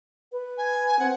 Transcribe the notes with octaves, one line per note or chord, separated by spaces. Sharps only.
B4
G#5
C4 F#5